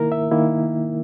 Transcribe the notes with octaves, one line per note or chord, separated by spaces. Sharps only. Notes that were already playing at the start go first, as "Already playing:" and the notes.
Already playing: D#3 A#3 E4 A#4
E5
D#3 A#3 E4